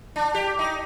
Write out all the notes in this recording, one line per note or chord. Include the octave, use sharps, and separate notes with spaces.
D4
G4
D#4